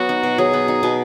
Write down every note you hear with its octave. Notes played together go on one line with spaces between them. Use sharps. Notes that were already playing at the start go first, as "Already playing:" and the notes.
Already playing: F#3 B3 F#4
D#4
B2
F#3 G#4
B3
D#4
B2